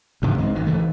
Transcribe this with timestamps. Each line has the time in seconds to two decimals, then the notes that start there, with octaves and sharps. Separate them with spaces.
0.22 D2 G#2 C3 G3
0.38 C#2 D#3 G#3 C4
0.55 G#1 D#3
0.67 B1 D#3 E3 A3